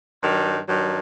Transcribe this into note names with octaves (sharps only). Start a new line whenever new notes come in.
G2 D#3 F#3
G2 D#3 F#3